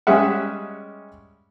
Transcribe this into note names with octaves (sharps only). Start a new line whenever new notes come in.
G3 G#3 C#4 G#4 E5 F#5